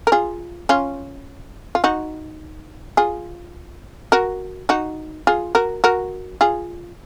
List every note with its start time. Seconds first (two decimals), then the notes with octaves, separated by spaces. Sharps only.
0.07 A#4
0.12 F4 G#4
0.69 C#4 F4
1.75 F4
1.84 D#4 F#4
2.97 F4 G#4
4.12 F#4 A#4
4.69 D#4 F#4
5.27 F4 G#4
5.55 F#4 A#4
5.84 F#4 A#4
6.41 F4 G#4